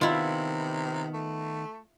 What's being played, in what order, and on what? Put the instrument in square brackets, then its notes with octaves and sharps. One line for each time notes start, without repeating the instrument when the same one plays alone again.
[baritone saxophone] C3 [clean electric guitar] D#3 B3 [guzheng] E4 F4
[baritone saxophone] A3